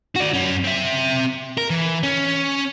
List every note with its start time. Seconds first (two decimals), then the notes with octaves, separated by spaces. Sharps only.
0.16 F#4 D5
0.34 F#2 C#4
0.64 C4 E5
1.58 A#4
1.70 E3
2.03 C#4